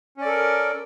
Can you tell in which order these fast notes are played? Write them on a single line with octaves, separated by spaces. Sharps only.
C#4 D5 A4 A#4